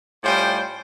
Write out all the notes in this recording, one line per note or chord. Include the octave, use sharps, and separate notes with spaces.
A2 G3 C#4 F4 C5 G5